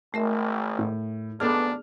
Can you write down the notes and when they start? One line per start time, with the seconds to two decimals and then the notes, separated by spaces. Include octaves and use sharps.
0.14 G#1 A3 A#4 E5
0.79 A2
1.40 G#1 B2 B3 D4 G#4 A4 F6